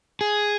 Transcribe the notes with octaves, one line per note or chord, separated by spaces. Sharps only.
G#4